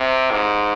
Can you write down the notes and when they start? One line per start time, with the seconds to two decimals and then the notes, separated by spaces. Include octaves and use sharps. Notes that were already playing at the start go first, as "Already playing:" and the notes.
Already playing: C3
0.31 G#2